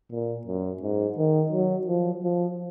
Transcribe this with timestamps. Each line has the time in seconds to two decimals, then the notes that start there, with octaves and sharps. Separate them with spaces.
0.11 A#2
0.47 F#2
0.82 G#2
1.18 D#3
1.52 F#3
1.87 F3
2.23 F3